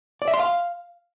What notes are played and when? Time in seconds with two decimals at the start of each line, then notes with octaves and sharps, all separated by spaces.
0.22 D5
0.28 E5
0.34 C6
0.39 F5